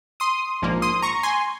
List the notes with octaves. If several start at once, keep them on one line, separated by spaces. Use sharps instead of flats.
C6 D#6
A#1 G#2 F3 A#3
C6 D#6
A#5 C#6
G#5 C6